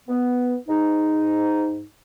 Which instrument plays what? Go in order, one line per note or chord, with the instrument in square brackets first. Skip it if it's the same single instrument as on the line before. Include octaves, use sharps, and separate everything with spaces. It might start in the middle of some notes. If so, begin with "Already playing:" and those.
[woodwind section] B3
G#2 D#4